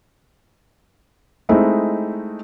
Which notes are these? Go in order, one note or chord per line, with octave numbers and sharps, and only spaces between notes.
G#3 A3 C4 D#4 E4